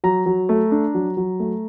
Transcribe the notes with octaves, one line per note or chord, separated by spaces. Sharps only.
F#3 A#5
F#3
A3
D4
F#3
F#3
A3